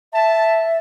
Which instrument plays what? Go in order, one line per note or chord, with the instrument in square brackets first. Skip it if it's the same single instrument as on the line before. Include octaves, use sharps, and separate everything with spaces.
[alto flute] E5 [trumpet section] A5